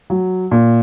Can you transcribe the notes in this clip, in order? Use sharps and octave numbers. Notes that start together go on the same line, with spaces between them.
F#3
A#2